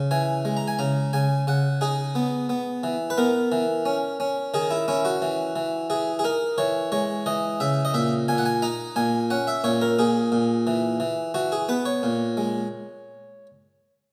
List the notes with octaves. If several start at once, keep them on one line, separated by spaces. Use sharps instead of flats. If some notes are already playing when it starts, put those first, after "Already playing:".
Already playing: C#3
E3 G#5
G#3
A#5
G#5
C#3 A#5
C#3 G#5
C#3 F#5
D#4 G#4
B3
B3
E3
B4
B3 A#4
E3
C#4
C#4
D#3 G#4
E4
C#4 E4
F#4
E3
E3
E3 G#4
G#4
D#4 A#4
E3 C#5
G#3 C#5
E3 D#5
C#3 E5
D#5
A#2 E5
A#2 G#5
F#5
G#5
D#4 A#5
A#2 G#5
C#4 F#5
E5
A#2 C#5
A#4
A#2 G#4
A#2
E3
E3
E3 F#4
G#4
B3 B4
C#5
A#2
G#3